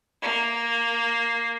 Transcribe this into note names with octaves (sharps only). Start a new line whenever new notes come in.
A#3